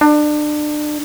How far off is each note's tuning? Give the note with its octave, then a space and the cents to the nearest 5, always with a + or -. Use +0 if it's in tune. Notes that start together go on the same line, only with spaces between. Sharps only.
D4 +30